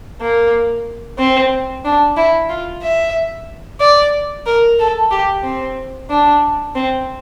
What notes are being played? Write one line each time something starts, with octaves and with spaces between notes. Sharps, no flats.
A#3
C4
D4
E4
F4
E5
D5
A#4
A4
G4
C4
D4
C4